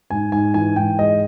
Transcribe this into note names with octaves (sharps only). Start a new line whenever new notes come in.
G#2 G#5
G#2 G#5
E3 G#5
G#2 G5
G#3 D#5